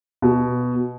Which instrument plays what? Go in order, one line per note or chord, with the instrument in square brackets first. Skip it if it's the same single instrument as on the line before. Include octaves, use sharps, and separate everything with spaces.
[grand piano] B2